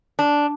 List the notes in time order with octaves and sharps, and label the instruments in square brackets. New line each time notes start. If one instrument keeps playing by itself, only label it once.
[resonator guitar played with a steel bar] D4